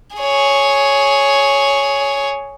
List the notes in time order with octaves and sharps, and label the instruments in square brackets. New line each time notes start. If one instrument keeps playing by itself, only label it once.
[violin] G#4 C#5